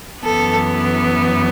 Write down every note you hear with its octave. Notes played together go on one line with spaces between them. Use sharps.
F#2 E3 B3 A4